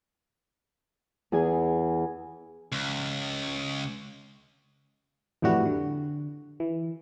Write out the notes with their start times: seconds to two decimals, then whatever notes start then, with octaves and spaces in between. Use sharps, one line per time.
1.32 E2 G#4 G#5
2.72 C#2
5.42 F2 A2 E3 G3 F#4
5.66 D3
6.60 E3